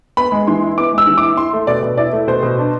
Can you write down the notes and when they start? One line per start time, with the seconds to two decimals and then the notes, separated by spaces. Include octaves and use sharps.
0.17 B3 B5
0.32 G#3
0.47 E3 C6
0.63 E4
0.78 B3 D6
0.93 G#3 E6
1.07 E3
1.18 D6
1.23 E4
1.37 E4 C6
1.53 A3
1.67 B2 D5
1.83 B2
1.97 E4 D5
2.13 A3
2.27 B2 C5
2.43 B2
2.58 D4